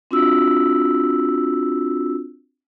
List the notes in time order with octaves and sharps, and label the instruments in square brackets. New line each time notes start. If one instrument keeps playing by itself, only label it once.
[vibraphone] C4 D4 F4 F#4 E6